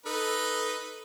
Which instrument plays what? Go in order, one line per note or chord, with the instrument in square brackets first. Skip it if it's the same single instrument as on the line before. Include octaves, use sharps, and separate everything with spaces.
[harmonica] D#4 B4 [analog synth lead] A4